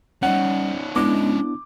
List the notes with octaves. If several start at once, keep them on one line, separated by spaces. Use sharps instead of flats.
G3 C#4 D#4 F#5
G#3 B3 D4 E4 D6